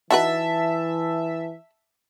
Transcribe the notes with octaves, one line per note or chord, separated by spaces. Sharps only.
E3 D#4 F#4 B4 E5 A5